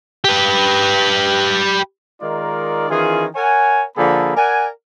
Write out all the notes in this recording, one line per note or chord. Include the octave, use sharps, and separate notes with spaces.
G4 B4
D#3 G#3 D#4 F4 A#4 D5
D#3 E3 C#4 F4 G#4
A#4 C#5 F#5 G#5
D3 F3 A#3 G#4 A4 B5
A#4 D5 F#5 G#5